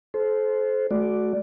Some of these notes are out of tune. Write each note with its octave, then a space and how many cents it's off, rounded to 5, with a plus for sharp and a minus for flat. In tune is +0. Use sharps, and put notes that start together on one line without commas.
A4 -35 C5 +0
A3 -35 F#4 +0 D5 +0